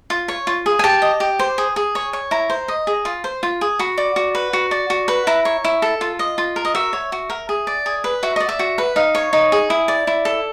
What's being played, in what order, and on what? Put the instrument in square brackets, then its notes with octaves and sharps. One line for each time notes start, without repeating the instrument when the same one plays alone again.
[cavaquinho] F4
C#5
F4
G#4
G#5
G4 A5
D#5
G4
C5
G#4
G#4
C#5
C#5
E4 A#5
C5
D#5
G#4
F4
C5
F4
G#4
F#4 B5
D5
F#4
B4
F#4
D5
F#4
B4
E4 A#5
C#5
E4
A4
F4
D#5
F4
A#4
D#5
F#4 E5
C#5
F#4
A#4
G#4
D5
G#4
B4
F#4 E5
D5 D#5
E5
F#4
B4
D#4 F5
C#5
D#4
G#4
E4
D5
E4
A4